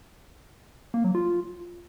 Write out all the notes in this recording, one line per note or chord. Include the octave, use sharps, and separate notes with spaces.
A#3
F#3
F4